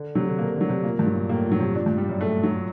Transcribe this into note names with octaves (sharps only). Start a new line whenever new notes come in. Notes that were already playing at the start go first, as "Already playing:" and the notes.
Already playing: D3
C3 F#3
D3
C3 A#3
D3 F#3
C3
A#2 A#3
G2
F#3
A#2
A2 A#3
A#2
F#3
C3
A#2 D4
G2
G3
F#2
A3
F#3